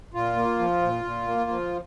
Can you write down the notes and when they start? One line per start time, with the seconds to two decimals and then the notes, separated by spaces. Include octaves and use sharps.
0.14 A#2 F4
0.36 A#3
0.59 F3
0.82 A#2
1.05 A#2
1.27 A#3
1.50 F3